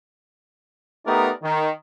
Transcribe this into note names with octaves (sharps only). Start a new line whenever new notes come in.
A3 B3 D#4 G4 A#4 D5
D#3